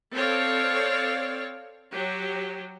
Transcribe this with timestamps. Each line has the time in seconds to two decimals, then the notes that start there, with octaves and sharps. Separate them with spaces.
0.13 C4 A4 C#5 D5 F5
1.93 F#3 G4